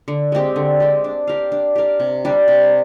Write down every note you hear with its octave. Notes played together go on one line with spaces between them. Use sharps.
D3
G#3 C4 G4
D3
G#3 C4 G4
D4
G4 A#4 F5
D4
G4 A#4 F5
C3
G3 D4 G4
C3